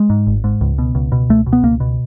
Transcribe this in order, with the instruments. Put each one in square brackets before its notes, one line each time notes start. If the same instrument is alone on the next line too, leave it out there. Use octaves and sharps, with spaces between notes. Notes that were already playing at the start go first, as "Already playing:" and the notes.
Already playing: [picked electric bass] G#3
G#2
G#1
G#2
C#2
B2
C#2
B2
C#2 A3
B2
B3
C#2 A#3
B2